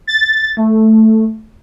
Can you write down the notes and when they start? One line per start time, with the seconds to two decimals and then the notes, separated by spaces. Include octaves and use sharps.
0.07 A6
0.57 A3